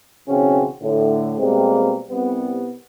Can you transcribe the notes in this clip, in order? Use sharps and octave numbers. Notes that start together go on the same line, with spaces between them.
B1 C#3 E3 C4 C#4 F#4
A2 D3
B2 G3 G#3 A#3 C4
C2 C3 G3 B3